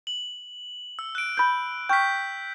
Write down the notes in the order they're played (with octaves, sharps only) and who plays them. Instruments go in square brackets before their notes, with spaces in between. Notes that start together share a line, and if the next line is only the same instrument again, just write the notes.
[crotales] F#7
E6
F#6 D7
[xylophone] B5 G6
[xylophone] G5 C#6 F6 [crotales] G6 B6